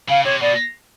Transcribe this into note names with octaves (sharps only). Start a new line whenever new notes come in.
C#3 F5
C3 C#5
B2 D5